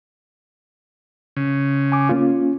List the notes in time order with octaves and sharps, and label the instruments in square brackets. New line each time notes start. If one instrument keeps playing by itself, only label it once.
[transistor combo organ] C#3
[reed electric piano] G#5 D6
A#3 C#4 F4